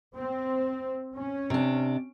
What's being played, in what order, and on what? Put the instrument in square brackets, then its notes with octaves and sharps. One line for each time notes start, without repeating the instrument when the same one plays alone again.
[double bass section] C4
C#4
[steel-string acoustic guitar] C3 D4